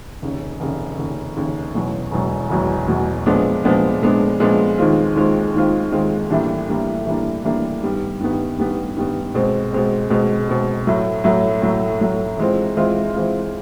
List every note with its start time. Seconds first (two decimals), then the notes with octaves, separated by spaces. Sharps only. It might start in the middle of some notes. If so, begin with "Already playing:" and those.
0.22 F1 D#2 C#3
0.60 F1 D#2 C#3
0.98 F1 D#2 C#3
1.37 F1 D#2 C#3
1.74 E1 E2 B2 F#3
2.12 E1 E2 B2 F#3
2.49 E1 E2 B2 F#3
2.87 E1 E2 B2 F#3
3.26 A#2 F3 G#3 B3 D4
3.64 A#2 F3 G#3 B3 D4
4.02 A#2 F3 G#3 B3 D4
4.40 A#2 F3 G#3 B3 D4
4.78 D#2 D#3 G#3 C4 F4
5.16 D#2 D#3 G#3 C4 F4
5.54 D#2 D#3 G#3 C4 F4
5.92 D#2 D#3 G#3 C4 F4
6.30 A2 E3 G3 A#3 D4
6.68 A2 E3 G3 A#3 D4
7.06 A2 E3 G3 A#3 D4
7.44 A2 E3 G3 A#3 D4
7.83 G2 D#3 G3 B3
8.20 G2 D#3 G3 B3
8.58 G2 D#3 G3 B3
8.97 G2 D#3 G3 B3
9.34 B2 G#3 C4
9.72 B2 G#3 C4
10.10 B2 G#3 C4
10.49 B2 G#3 C4
10.87 A2 F#3 A3
11.24 A2 F#3 A3
11.62 A2 F#3 A3
12.00 A2 F#3 A3
12.38 E3 G#3 C4 F4
12.77 E3 G#3 C4 F4
13.14 E3 G#3 C4 F4